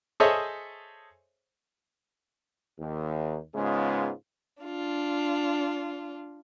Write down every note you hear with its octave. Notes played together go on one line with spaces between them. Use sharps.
G#4 A4 C5 C#5 D#5 E5
D#2
G#2 C#3 G#3 B3 C#4 F4
D4 F4